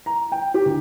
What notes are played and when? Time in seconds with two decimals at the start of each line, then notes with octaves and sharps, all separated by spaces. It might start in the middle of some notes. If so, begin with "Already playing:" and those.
0.06 A#5
0.32 G5
0.54 G4
0.65 D2